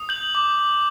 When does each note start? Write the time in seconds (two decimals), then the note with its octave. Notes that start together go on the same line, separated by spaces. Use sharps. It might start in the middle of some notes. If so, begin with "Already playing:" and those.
Already playing: D#6
0.09 G6 F#7
0.35 D6